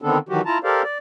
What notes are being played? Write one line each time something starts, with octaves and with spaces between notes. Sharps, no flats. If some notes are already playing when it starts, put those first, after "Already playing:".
D3 D#3 B3 C4 D4 A4
D#3 E3 F#3 F#4 G4
E4 F4 A5 A#5
G4 A4 A#4 C5 D5 F5
D5